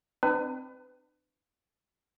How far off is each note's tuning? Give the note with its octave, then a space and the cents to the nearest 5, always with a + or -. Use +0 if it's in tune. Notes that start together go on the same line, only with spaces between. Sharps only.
C4 +0 D#4 -45 B4 +30